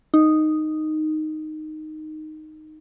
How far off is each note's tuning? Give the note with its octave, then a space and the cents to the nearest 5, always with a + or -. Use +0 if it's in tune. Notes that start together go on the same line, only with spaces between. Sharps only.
D#4 -5